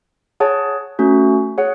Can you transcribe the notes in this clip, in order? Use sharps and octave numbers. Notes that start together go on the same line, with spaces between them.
G#4 C#5 F#5 A5
A3 C#4 F#4
G#4 C#5 F#5